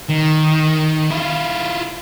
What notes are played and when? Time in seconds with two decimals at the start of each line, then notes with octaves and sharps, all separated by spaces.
0.10 D#3
1.11 E4 F4